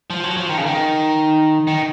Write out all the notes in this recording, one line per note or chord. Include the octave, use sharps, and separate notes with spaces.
F3
F#3
F3
D#3
C#3
D#3
D#3